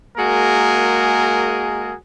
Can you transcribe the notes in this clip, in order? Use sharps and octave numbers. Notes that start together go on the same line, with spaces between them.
G#3 A#3 F#4 G#4 A#4